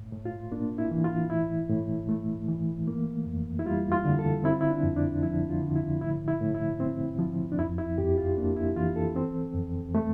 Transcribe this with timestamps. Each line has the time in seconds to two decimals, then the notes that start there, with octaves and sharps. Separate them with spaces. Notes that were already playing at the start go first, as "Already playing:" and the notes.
Already playing: A2
0.12 A2
0.25 F4
0.52 A#3 D4
0.78 E4
0.91 E3
1.04 F4
1.30 A2 E4
1.70 A2
2.09 A3
2.48 E3
2.88 A#3
3.26 F2
3.59 E4
3.66 G3 F4
3.92 F4
4.05 D3
4.19 A4
4.44 C4 E4
4.52 F4
4.61 E4
4.71 D4
4.84 F2
4.97 D4
5.23 F3 E4
5.49 F4
5.62 D3
5.76 E4
6.01 A2 E4
6.28 E4
6.41 A2
6.54 E4
6.80 C4
7.19 F3
7.52 D4
7.58 F2 E4
7.78 E4
7.98 F2 G4
8.18 F4
8.37 A#3 D4
8.57 E4
8.76 E3 F4
8.96 A4
9.16 C4
9.55 F2
9.95 A3